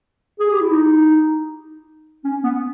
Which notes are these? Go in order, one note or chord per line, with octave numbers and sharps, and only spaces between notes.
G#4
G4
E4
D#4
C#4
B3